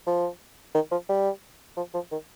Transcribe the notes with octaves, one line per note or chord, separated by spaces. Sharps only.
F3
D#3
F3
G3
F3
F3
D#3